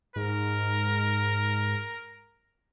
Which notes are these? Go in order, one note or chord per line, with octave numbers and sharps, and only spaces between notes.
G#2 A#4